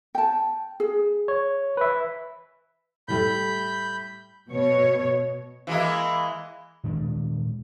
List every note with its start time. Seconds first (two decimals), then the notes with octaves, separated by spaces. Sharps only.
0.15 G5 A5
0.80 G#4
1.28 C#5
1.77 B4 E5
3.08 A2 G3 A3 B5 G6
4.50 B2 C#5
5.67 E3 G#3 A#3
6.84 A#2 D#3 G#3 D4